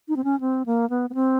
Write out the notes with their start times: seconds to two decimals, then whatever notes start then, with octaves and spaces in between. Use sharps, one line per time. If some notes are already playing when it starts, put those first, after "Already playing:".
0.08 D#4
0.16 C4
0.24 C#4
0.40 C4
0.66 A#3
0.90 B3
1.10 B3
1.15 C4